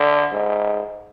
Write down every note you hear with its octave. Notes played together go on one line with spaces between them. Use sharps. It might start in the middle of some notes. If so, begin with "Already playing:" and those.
Already playing: D3
G#2